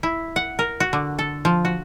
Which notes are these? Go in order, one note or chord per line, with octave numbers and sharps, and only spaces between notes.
E4
F#5
A#4
F#4
D3
A4
F3
F#4